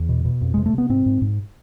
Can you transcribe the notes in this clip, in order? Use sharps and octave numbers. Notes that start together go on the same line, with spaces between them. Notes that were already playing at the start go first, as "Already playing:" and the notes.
Already playing: E2
B2
B2
F2
C3 G#3
A3
C3 B3
G#2 C4
G#2
G#2